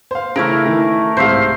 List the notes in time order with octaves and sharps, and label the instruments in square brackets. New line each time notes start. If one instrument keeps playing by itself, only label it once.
[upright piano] C5 F5
[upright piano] C#3 E3 [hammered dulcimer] A3 E4 A#4
[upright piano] D#3 E3
[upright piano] C2 G#2 [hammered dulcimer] C5 E5 F5